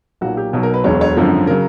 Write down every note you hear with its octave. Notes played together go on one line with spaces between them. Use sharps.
B1 A#2 F#3 F#4
G4
B1 B2 F#3
A#4
B4
E1 D2 D3 F#3 C#5
C#5
G#1 F#2 D3 F3
C#3 F#3 A#4